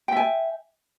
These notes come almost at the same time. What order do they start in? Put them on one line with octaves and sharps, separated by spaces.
G5 E5 G#5